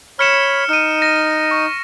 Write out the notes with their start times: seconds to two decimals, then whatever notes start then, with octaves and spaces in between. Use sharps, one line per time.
0.19 C#5 B5 F6 C#7 E7
0.69 D#4 F6 D#7
1.02 A#6
1.51 C#6